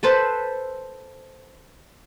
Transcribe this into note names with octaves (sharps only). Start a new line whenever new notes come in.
A4 B4 C5 A5